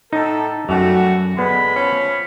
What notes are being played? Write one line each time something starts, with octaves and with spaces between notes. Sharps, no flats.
A2 D#4 A4
F#2 G3 A3 F#4
A#2 D3 G#3 B3 B5
F3 C#4